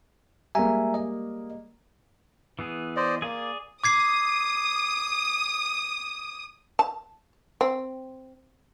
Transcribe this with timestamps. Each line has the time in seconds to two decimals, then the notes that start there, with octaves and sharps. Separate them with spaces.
0.55 G3 G#3 A#3 E5 G#5 A#5
0.94 D#5
2.59 E3 B3 G#4
2.97 C5 D5 D#5
3.22 A#3 G#4 D5
3.84 D6 D#6 G#6 C7
6.79 A5
7.61 C4